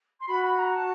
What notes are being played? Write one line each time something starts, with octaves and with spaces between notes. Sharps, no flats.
C6
F#4 B5
B5
A#5
A5